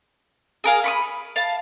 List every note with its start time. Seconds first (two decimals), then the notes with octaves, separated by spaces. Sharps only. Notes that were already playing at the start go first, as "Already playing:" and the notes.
0.64 G#4 A#4 F5
0.84 B5 C#6 D#6
1.36 F5 A5